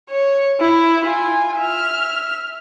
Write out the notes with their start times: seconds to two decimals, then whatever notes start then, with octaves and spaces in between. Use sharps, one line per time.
0.10 C#5
0.60 E4
1.04 F4 G#5
1.57 E5 F6